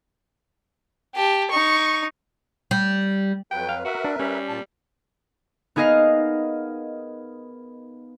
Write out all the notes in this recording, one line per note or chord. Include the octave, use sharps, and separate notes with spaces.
G4 A5
D#4 C#6
G3
F2 F#3 B4 G5
F5
F#4 A#4 B4 E5
D4
G3 C#4
A#2 A5
B3 D#4 G#4 A#4 D#5 F5